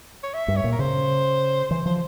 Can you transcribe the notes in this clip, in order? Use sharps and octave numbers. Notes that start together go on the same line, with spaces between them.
C#5
E5
G2
C#5
A#2
A#4
C#3 C5
E3 C5
F3 C5